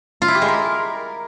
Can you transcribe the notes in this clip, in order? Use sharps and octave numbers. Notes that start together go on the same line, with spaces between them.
F4
E4
G4
G#3
A#4